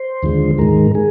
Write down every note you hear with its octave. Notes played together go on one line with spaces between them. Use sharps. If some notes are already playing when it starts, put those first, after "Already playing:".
Already playing: C5
D#2 D3 F3 G#3
G#2 D#3 G#3 A#4
G#4